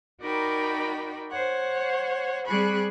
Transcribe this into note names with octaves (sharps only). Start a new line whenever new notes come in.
D#4 F#4 A#4 D5 G5 B5
C5 C#5 F#5
G3 C4 G#4 B5 C#6 F#6